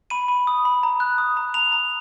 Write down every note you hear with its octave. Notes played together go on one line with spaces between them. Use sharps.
B5 D#7
B5
D#6
B5
A#5
F#6
D#6
A#5
A#5 F7
A#5